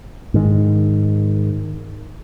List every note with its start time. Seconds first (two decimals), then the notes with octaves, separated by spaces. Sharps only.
0.34 G#2 D#3